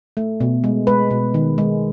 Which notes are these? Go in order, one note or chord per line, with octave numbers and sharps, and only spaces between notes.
A3
B2
G#3
G#3 B4
B2
D#3
G#3